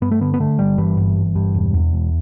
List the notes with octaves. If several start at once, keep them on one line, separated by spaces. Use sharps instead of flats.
G2 B3
A3
D3 B3
B3
D3 A3
G1 G3
G2 E3
G1
G1
G2
E1
E2
E1